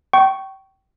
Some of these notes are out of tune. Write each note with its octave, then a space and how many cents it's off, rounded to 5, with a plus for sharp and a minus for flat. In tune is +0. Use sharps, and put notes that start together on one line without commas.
G5 -25 C#6 +0